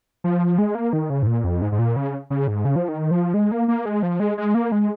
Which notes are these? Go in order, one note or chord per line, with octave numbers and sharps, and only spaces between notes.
F3
G#3
A#3
D#3
C#3
G#2
A#2
F2
G#2
G#2
A#2
C#3
C#3
G#2
C#3
F3
D#3
F3
G#3
A#3
A#3
G#3
F3
G#3
G#3
A#3
G#3